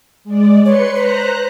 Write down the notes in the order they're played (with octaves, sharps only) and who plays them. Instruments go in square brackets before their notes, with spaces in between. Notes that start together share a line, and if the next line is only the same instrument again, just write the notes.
[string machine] G#3 D5
[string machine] B4 C6 C#7 [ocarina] C#5
[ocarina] B4 [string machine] C5 A#5 F#6